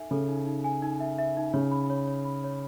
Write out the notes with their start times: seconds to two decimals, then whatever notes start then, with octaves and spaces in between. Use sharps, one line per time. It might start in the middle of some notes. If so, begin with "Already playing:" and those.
Already playing: D#4 A4 E5 G#5
0.11 C#3 A4
0.29 D#4
0.46 D#4
0.64 G#5
0.82 D#4
1.00 E5
1.18 E5
1.37 D#4
1.54 C#3 C#5
1.71 B5
1.90 C#5
2.07 C#5
2.25 B5
2.44 C#5